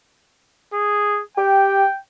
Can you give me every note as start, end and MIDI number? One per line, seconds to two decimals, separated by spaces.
0.74 1.22 68
1.38 1.84 67
1.38 1.99 79